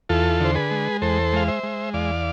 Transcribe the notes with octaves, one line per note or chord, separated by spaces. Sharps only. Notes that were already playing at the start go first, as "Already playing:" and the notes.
E2 F4 A4
D3 C5
G#4 B4
G#3
E2 A4 C5
G#3 F5
C5 E5
G#3
E2 D5 F5